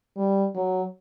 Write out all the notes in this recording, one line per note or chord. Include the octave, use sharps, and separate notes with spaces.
G3
F#3